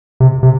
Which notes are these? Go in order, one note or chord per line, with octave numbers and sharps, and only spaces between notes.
C3
C3